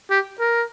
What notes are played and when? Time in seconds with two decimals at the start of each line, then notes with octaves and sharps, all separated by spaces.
0.11 G4
0.40 A#4